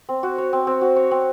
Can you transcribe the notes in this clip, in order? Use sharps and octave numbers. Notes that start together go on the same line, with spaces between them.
C4
F#4
C#5
C4
C4
F#4
C#5
C4